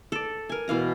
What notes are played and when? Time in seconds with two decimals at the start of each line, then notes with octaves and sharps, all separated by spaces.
0.12 A4 D5
0.49 A#4 G#5
0.68 B2 E3 F5 A#5